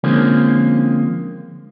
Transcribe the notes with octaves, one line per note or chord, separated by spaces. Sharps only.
D3 F3 G#3 A#3 C4 C#4